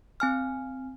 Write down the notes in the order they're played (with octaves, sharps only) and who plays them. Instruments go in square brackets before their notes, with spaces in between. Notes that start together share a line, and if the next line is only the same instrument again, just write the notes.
[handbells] C4 G#5 F6